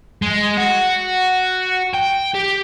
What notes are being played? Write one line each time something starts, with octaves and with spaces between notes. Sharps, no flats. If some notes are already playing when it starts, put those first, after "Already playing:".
G#3
F#4
G5
G4